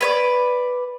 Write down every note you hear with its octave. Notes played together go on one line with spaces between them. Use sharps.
B4 C#5 D5